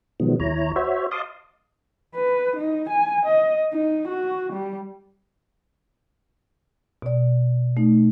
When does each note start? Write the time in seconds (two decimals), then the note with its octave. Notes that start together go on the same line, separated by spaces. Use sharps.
0.20 B2 D#3 F3 F#3 G#3 B3
0.40 D#2 E4 C#5 A#5
0.76 F#4 C5 C#5 E5
1.11 D#5 F5 A5 C6 D6 D#6
2.15 B4
2.57 D#4
2.90 G#5
3.26 D#5
3.73 D#4
4.08 F#4
4.53 G3
7.02 B2 D5
7.77 A3 D#4